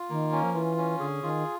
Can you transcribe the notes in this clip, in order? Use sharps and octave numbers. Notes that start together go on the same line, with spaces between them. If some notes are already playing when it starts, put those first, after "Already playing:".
Already playing: F4
D#3 A#3
C#4
F3
E3 F4
C#4
D3 G#4
D#3 F4